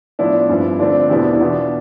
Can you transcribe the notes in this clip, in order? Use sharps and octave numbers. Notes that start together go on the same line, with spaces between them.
A2 F3 B3 D4 E4
G2 F3 C4
D3 A3 C4 D4 F4
E2 B2 B3 D4 E4 G4
E4
B2 B3 D4 F4